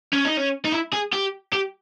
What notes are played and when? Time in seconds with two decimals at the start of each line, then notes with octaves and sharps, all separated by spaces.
0.13 C#4
0.25 D#4
0.37 C#4
0.65 D#4
0.72 E4
0.93 G#4
1.13 G4
1.53 G4